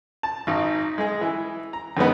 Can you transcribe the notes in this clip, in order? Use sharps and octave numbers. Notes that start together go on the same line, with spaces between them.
A5
G#1 D#4
G#3 G#4
E3
A#5
F2 D#3 G#3 B3